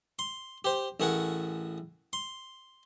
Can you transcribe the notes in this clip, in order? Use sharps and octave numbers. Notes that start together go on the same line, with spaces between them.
C6
G4 C5
A1 A3 G#4 A#4 F#5
C6